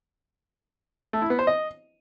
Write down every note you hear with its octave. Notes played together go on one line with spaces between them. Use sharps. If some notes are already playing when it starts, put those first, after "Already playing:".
A3
E4
B3
C5
D#5